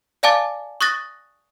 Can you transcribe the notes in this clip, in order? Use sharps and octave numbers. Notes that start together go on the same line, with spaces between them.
D5 F5 G#5 A5 D6 A6
C#6 D#6 F#6 A6 A#6